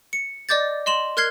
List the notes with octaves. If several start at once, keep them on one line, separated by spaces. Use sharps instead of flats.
C#7
D5 D#5 D6 G6 A6
D#5 C6 E7 F#7
A#4 F6 F#6 G#6 C7 G7